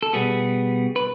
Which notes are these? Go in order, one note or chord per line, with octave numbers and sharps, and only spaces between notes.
A4
B2 G3 B3 G#4
B4